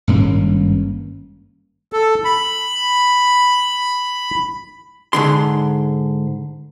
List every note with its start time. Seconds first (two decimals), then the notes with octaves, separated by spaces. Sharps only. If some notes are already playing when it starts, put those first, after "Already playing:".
0.08 G#1 G2 A#3 C#4
1.93 A4
2.25 B5
5.13 G#2 D3 C6